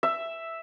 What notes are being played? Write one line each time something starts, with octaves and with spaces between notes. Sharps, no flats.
E5